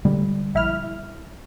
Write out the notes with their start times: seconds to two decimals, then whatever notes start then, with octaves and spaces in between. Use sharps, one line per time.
0.05 D3 G3 G#3
0.54 A#1 E4 F6